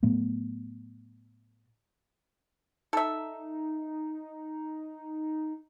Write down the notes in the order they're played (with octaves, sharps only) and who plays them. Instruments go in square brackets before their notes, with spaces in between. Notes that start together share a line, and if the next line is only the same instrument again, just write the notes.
[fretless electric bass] A2 F#3 A3 B3
[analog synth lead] D#4 [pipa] A4 E5